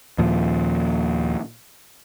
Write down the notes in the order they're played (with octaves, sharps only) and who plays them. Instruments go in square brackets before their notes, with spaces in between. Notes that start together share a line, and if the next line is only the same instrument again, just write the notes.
[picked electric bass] D#2 A#2 F3